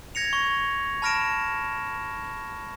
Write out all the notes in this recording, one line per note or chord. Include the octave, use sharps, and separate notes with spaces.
G#6 A#6 C#7 F7
C#6
A5 B5 F6 A#6 D7 E7